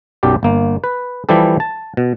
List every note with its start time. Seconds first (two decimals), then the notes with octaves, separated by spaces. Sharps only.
0.23 B1 F#2 G4 D5
0.43 G1 A#3
0.84 B4
1.29 E3 F3 G3 G4 A4
1.60 A5
1.97 B2